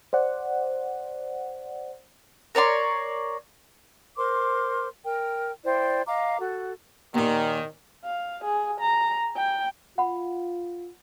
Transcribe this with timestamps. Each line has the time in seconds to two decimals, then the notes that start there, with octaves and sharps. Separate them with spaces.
0.13 C5 D5 F#5
2.55 A#4 C#5 D5 C6
4.17 A#4 C5 C6 D6
5.04 A#4 G5
5.65 E4 C5 D5 G5
6.07 D#5 F5 A#5 D6
6.39 F#4 A4
7.14 D#2 A#2 D#3
8.05 F5
8.44 G#4
8.81 A#5
9.37 G5
9.98 F4 F#5 B5